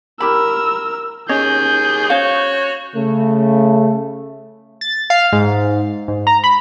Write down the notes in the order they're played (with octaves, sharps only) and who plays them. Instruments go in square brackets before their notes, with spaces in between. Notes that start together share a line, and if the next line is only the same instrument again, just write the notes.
[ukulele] E4 G4 B5 [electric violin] A#4 E6
[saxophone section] D#2 G#4 [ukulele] C#4 C#5 D#5 [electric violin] G6
[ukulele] C#4 C5 F5 [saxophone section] F#4 C#5
[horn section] C#3 A3
[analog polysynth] A6
F5
G#2
G#2
A#5
B5